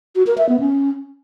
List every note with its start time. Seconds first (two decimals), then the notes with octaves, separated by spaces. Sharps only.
0.16 F#4
0.27 A#4
0.38 E5
0.49 B3
0.60 C#4